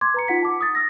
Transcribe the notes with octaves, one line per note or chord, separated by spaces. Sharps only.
C6 D6 G#6
B4 A#5 C#7
D#4 F4 F#5 B6 C#7
A5 D6
D#6 A6
E6 A#6